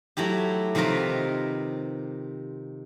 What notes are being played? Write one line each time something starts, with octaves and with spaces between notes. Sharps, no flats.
F#3 A3 E4 G4
C3 D#3 F3 F4 A#4 B4